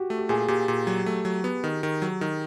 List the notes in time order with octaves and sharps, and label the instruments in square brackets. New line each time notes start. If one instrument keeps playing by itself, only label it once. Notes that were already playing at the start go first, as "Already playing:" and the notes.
Already playing: [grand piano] F#4 G4
[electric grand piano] A3
[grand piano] G4
[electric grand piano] A#2 [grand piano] G#4
[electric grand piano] A#2 [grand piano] G4
[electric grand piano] A#2
F#3
A3
F#3
B3
D#3
D#3
F#3
D#3